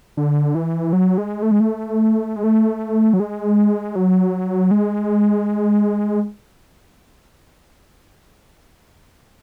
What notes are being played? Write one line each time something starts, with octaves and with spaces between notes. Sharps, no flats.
D3
E3
F#3
G#3
A3
G#3
A3
G#3
A3
F#3
G#3
F#3
G#3